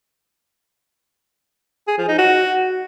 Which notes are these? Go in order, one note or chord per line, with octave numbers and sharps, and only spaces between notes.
G#4
F3
D#4
F#4